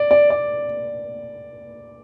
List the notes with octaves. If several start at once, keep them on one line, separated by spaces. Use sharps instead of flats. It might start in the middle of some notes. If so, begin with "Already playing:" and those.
Already playing: D5
D5
D5